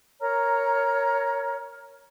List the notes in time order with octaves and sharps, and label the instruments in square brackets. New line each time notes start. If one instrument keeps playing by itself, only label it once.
[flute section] A#4 C#5 A#5 F6